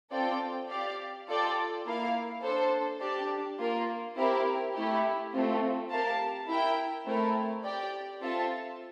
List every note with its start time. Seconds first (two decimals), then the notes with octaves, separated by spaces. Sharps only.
0.12 C4 F4 A4 D5 G5
0.70 G4 D5 F5
1.28 F4 A4 D5 G5
1.86 A#3 E4 A#4 F5
2.43 D4 A4 C5
3.01 D4 G4 D5 A5
3.59 A#3 F4 A#4
4.17 C4 E4 G4 A#4
4.75 A3 E4 G4
5.33 A3 C4 F4
5.90 G4 A#4 F5 A5
6.48 E4 A#4 E5 G5
7.06 A3 C4 E4 A#4
7.64 G4 D5 G5
8.22 C4 F4 A4 E5 A5